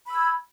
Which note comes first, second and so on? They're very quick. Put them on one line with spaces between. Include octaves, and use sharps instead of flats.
B5 E6 G#6